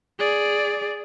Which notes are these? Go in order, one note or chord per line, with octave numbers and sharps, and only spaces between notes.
G#4 D5